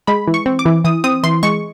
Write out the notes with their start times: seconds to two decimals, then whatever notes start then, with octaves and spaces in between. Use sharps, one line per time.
0.07 G#3 B5
0.27 E3
0.34 C#6
0.46 C4
0.59 D6
0.65 E3
0.84 E3 D#6
1.04 C4 D#6
1.23 E3 C6
1.43 G#3 C#6